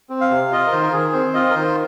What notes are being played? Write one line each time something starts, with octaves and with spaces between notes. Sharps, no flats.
C4
F5
C3
F4 D#5
A#4
D#3 C5
A#4
D#3 G#4
C4 C5
F4 D#5
A#4
D#3 C5